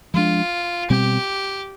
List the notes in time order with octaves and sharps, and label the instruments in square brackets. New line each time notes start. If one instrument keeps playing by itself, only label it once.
[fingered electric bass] F3 G#3 D4 [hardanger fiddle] F4
[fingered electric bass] B2 G3 C4 [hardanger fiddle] G4